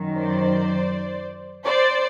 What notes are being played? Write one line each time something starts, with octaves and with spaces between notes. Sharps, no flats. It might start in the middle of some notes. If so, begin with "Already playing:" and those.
Already playing: F#2 D#3 F#3
C5 D5
C5 D5